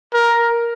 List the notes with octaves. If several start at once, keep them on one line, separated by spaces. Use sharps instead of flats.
A#4